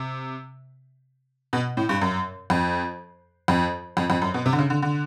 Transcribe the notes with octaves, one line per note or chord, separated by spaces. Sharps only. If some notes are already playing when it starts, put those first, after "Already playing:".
Already playing: C3
B2
A2
G2
F#2
F2
F2
F2
F2
F#2
B2
C3
D3
C#3
D3
D3